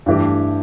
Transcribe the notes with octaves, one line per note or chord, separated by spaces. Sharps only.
G2 E3 A3 G4